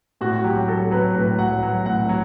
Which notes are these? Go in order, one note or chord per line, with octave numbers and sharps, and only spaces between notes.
A2 F#4
F#3 G4
F#3 A4
F#3 B4
A2 B4
F#3 F#5
F#3
A2 F#5
F#3